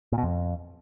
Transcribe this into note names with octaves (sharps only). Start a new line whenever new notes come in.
A#2
B2
F2